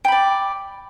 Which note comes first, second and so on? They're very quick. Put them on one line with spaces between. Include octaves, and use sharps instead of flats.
G5 B5 D5